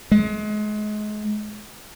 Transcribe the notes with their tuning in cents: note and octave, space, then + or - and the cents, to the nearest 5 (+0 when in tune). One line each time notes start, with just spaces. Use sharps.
G#3 +30